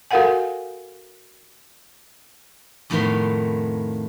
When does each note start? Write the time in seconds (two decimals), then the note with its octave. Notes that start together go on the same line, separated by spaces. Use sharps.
0.11 F#4 A4 A#4 F5 F#5 G#5
2.90 F2 A2 D#3 B3 B5 C6